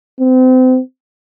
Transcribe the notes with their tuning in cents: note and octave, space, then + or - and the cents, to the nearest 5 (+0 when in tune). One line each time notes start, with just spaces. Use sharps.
C4 -35